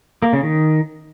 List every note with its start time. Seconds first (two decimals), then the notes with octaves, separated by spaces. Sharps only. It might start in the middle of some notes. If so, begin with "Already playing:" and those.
0.22 A#3
0.33 C#3
0.43 D#3